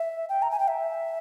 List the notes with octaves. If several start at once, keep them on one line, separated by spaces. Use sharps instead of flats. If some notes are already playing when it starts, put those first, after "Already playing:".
Already playing: E5
G5
A#5
G#5
G5
E5